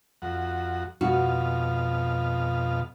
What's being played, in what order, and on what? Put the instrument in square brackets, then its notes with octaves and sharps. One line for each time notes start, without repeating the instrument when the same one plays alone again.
[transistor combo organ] F2 F#4
[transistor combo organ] F2 B2 F5 [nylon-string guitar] F#4